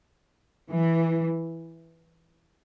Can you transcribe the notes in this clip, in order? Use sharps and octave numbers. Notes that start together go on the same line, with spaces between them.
E3